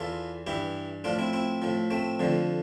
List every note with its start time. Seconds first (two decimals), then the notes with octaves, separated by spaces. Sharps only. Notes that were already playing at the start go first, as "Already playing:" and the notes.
Already playing: E2 E3 F4 A4
0.47 G2 E3 E4 G4
1.04 A2 F3 D4 F4
1.19 C4 E4
1.33 C4 E4
1.62 A2 F3
1.91 A3 C4
2.20 F2 D3 F3